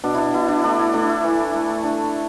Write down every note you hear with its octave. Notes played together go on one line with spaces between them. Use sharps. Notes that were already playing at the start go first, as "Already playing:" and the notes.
B2 D4
D4 E4
B2 E4
D4
A3 D4
E4
A3 D4
E4
E3
A3
D4